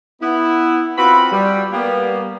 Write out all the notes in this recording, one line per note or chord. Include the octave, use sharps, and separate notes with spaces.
B3 E4
C4 F4 F#4 B4 B5
G3
G3 A#3 B3